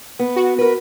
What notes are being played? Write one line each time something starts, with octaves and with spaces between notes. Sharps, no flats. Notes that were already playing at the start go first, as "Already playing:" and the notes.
B3
F#4
A#4 B4